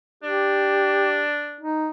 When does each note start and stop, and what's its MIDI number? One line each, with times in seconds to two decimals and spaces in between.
0.23 1.66 62
0.23 1.24 67
1.61 1.91 63